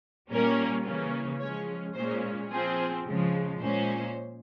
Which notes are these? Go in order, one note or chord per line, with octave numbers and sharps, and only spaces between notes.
A#2 G3 A#3 C#4 A#4
C#3 E3 A#3 C#4
F3 G#3 C#4 C#5
A#2 G#3 C#4 C5
F3 C4 G#4
C#3 F3 G#3
A#2 G#3 C#4 C5